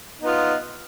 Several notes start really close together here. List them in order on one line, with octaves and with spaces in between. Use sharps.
D#4 B3 F4